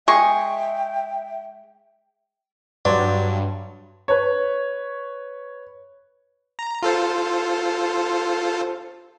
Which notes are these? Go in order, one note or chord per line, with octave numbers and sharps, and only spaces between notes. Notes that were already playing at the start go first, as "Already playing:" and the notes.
G#3 G#4 E5 G5 C#6
G2 F#3 B4 D5 C6
B4 C#5
A#5
F4 A4 C5